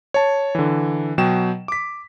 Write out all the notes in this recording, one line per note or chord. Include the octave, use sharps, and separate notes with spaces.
C#5 A5
D3 E3
B2 F#3 G5 E7
D6 B6